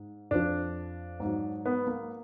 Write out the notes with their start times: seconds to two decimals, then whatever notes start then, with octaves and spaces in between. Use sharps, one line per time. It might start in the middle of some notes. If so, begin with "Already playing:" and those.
Already playing: G#2
0.31 F2 F3 D4
1.20 G#2
1.25 F#3
1.66 B3
1.87 A#3